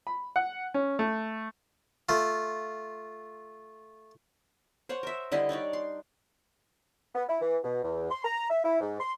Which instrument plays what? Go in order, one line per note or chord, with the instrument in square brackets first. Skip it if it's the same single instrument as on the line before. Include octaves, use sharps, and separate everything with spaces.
[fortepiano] B5
F#5
C#4
A3
[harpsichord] A3 F4
[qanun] C5 C#5 F#5
A#4 E5
D3 G3 E4 D#5
D4 D#4 C#5 D5
C6
[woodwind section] B3
E4
E3
B2
E2
C6
A#5
E5
E4
G#2
C6